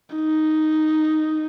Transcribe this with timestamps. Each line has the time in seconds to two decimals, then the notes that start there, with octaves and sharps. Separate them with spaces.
0.16 D#4